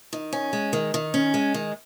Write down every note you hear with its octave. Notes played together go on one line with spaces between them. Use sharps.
D#3
C#4
G#3
D#3
D#3
C#4
G#3
D#3